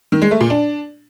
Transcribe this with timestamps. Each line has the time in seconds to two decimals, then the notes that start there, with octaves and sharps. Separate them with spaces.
0.12 D#3
0.22 G#3
0.31 A3
0.41 A#2
0.50 D4